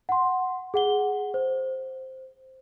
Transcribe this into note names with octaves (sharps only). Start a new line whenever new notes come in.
F#5 C6
G#4 F#5 G7
C5